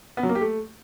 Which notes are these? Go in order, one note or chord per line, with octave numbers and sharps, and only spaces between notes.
B3
F#3
A#3
G4
A3